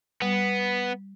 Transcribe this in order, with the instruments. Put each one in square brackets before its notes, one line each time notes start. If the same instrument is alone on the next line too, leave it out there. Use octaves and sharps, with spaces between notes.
[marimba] G3 [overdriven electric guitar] B3